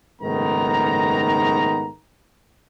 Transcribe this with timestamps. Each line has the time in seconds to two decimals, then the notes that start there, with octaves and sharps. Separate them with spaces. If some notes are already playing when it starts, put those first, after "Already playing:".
0.22 F#1 G#2 D#3 A3 B3 A#5